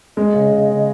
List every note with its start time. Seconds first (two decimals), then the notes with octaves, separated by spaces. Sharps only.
0.17 G#3 D#5
0.34 C#3
0.52 C#3
0.70 C#3